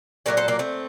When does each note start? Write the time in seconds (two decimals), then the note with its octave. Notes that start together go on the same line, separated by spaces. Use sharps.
0.26 A#2 F#3 A3 A#4 D5
0.37 A4 C5
0.48 A#3 D4
0.59 A3 C4